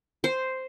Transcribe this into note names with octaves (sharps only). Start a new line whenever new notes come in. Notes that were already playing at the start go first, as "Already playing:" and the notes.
C5